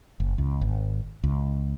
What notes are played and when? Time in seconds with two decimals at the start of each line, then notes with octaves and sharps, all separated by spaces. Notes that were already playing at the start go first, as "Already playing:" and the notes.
0.20 F#1
0.38 C#2
0.61 G#1
1.24 C#2